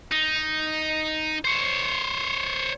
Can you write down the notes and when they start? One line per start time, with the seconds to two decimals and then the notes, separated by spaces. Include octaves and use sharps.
0.11 D#4
1.45 C5 C#5